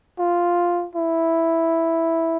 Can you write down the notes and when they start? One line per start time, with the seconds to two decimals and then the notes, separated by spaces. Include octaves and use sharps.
0.19 F4
0.95 E4